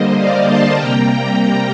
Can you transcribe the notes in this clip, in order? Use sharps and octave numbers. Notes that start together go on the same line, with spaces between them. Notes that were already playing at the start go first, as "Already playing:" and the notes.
Already playing: D3 G3 A#3 C5 D#5
D5 F5
A5 C6
C3 G3 A#3 G5 A#5